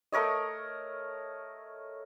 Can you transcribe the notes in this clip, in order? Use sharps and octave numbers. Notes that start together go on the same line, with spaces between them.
A3 A#4 C#5 D#5